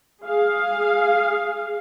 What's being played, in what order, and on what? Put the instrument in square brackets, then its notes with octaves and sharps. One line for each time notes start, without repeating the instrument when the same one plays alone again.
[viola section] G#4 F5